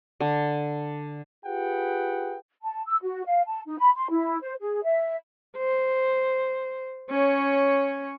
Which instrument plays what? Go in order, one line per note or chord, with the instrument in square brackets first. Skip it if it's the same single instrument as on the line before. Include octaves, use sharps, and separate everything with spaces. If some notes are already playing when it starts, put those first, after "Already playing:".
[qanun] D3
[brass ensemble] F4 G4 G#4 B4 F#5 G5
[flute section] A5
E6
F#4
F5
A5
D#4
B5
C6
E4
C5
G#4
E5
[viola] C5
C#4 C#5